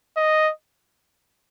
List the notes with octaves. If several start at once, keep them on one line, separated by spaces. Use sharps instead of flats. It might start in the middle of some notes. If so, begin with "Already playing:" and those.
D#5